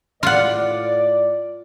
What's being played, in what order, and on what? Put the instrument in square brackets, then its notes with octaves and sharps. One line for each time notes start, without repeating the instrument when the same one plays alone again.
[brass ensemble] A2 D5 [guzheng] F4 F#5